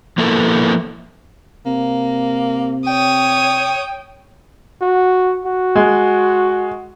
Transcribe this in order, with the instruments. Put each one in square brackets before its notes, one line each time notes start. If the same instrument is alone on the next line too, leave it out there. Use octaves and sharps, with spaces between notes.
[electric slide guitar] F3 A#3 B3 E4 A4 A#4
[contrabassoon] C3 [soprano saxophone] A#3
[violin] C#5 D#6 [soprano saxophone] G5
[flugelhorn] F#4
F#4
[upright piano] G#3